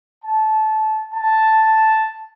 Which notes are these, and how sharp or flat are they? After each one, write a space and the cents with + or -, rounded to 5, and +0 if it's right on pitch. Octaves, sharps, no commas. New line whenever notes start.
A5 -20
A5 +0